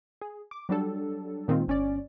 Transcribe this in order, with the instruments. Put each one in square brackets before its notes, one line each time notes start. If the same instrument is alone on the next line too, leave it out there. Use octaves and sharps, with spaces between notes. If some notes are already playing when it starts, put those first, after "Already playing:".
[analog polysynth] G#4
D6
F#3 G3 D4 A4
A#2 D#3 G#3 C4 F4
G1 C#4 D5